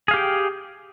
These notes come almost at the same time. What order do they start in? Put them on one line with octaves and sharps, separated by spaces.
G#4 F5 G4 G5